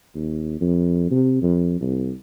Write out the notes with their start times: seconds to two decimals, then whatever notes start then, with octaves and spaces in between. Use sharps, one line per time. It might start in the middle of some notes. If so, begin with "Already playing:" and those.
0.15 D#2
0.61 F2
1.11 C3
1.42 F2
1.81 C2